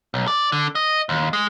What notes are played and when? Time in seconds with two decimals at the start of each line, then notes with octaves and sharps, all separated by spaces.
0.14 B1
0.27 D5
0.52 D3
0.75 D#5
1.09 D#2
1.33 G#3